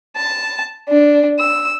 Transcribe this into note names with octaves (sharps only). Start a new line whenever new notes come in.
A5
D4
E6